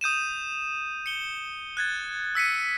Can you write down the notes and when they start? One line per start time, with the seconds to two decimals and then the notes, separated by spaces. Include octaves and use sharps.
0.01 D#6 G6 D#7 E7
1.06 C#7 G7
1.77 F#6 G#6 A6
2.35 E6 B6 C#7 D#7